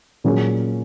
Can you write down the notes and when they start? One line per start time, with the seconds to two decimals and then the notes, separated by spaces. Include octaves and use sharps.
0.24 A#2 F#3 C#4 G#4